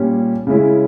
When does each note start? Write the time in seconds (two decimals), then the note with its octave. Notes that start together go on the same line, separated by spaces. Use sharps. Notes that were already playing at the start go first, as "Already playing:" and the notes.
Already playing: A#2 G3 C#4
0.47 C#3 G#3 C#4 E4